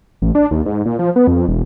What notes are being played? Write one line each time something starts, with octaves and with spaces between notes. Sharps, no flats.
A1
D4
D#2
G#2
A#2
F3
B3
F2
E1